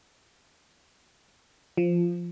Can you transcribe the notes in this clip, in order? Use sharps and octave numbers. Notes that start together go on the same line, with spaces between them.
F3